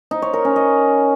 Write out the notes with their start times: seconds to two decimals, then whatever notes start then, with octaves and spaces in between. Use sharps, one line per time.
0.11 D#4
0.22 C#5
0.33 A#4
0.45 C#4
0.56 D#5